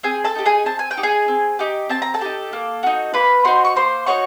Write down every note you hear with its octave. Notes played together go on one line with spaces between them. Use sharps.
C4 G#4 G#5
A4 A5
D#4 G4
G#4 G#5
C4 A5
G#5
G5
D#4 G4
G#4 G#5
C4
D#4 G4
C4 A5
A#5
A4 A5
D#4 G4
A#3
D#4 F#4
A#3 B4 B5
D#4 F#4 C5 C6
C#6
A#3 C5 C6
D#4 F#4 C#5 C#6